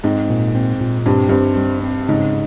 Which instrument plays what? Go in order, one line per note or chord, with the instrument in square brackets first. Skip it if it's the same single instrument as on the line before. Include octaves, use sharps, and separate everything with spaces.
[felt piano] G#2 [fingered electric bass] C4
[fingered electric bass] A#2
C4
A#2
[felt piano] G2 [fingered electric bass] C4
[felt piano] G2 [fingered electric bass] C4
[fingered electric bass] G3
C4
[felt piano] G#2 [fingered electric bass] C#3